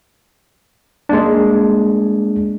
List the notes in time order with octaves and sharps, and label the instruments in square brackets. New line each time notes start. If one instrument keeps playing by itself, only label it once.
[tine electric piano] G#3 A#3 D4